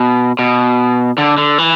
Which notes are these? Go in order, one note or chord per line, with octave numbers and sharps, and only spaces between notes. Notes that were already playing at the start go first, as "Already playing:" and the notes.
Already playing: B2
B2
D3
D3
E3